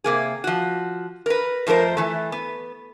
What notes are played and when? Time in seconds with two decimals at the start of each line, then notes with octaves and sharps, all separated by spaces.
0.04 C3 A#3 G#4
0.44 F3 F#4
1.26 A#4 B4
1.67 F2 F3 A3 A#4 C5
1.97 E3 A3
2.32 B3